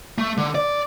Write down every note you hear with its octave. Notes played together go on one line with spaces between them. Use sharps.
A3
D3
D5